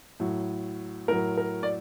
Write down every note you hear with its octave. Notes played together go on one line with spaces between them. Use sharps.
A2 F#3
A2 F#3 A#4
A#4
D5